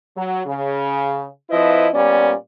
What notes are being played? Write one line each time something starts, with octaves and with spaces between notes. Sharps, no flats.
F#3
C#3
F2 F3 E4 B4 D#5
A#2 G3 B3 C#4 D5